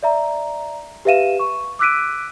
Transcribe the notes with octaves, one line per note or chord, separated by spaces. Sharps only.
D5 E5 A#5
G4 B4 E5 F5 D#7 E7
C#6
D6 E6 F#6 B6 D7 D#7